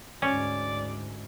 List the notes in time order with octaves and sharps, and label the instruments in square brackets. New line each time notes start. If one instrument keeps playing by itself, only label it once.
[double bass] D2 G#2 [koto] C#4 [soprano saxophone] D5